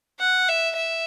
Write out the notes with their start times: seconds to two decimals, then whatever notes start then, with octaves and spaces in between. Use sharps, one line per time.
0.20 F#5
0.48 E5
0.76 E5